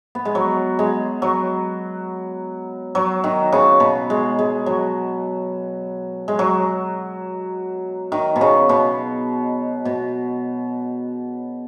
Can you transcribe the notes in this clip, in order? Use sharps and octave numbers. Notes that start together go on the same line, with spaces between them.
B3
G#3
F#3
G#3
F#3
F#3
D#3
C#3
B2
G#3
G#3
F#3
G#3
F#3
D#3
B2
C#3
B2
B2